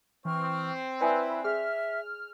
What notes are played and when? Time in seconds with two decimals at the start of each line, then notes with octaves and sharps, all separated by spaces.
0.25 E3 C4 G5 C#6 F6
1.01 E4 B4 D5 G#5 B5 D#6
1.44 G#4 E5 F6